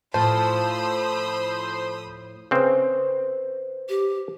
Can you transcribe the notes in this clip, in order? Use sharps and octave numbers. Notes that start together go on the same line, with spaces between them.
A2 F3 C5 A5 B5 D#6 E6
C#3 C4 B4 C5
G4